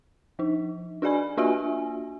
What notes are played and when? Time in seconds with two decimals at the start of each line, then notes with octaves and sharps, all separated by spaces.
0.39 F3 D#4
1.02 D4 F#4 G#4 D5 G#5 B5
1.37 A#3 D4 F4 F#4 E5 G#5